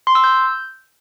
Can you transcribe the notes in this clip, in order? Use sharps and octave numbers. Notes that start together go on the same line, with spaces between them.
C6
E6
G6